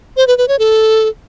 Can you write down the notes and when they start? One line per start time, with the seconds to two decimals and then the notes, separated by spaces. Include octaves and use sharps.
0.17 C5
0.27 B4
0.38 B4
0.48 C#5
0.59 A4